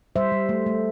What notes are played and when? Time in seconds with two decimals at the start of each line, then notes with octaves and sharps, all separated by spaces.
0.16 G3 C5 E5
0.32 G3
0.49 A3
0.66 A3